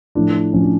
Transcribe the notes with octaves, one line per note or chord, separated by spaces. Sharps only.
A2 F3 D4
A2 F3 C#4
D4